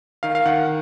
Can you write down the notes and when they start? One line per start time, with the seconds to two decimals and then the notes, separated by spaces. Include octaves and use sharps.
0.23 D#3 F5
0.35 F5
0.46 D#3 F#5